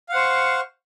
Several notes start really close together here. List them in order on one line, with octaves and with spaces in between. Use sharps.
F5 F#5 C5 C#6